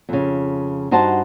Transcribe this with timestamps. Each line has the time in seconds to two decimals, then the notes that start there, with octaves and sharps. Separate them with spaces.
0.09 F2 C#3
0.91 G2 D#4 F#4 C5 F#5 A5